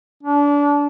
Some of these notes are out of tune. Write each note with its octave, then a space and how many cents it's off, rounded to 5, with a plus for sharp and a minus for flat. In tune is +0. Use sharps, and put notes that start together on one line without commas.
D4 -30